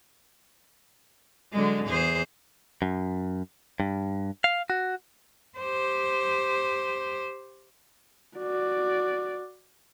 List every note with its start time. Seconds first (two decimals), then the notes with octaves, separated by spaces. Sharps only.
1.52 D3 F#3 G#3
1.86 E2 G#4 C5
2.82 F#2
3.80 G2
4.44 F5
4.70 F#4
5.58 G4 C5
8.38 F#4 D5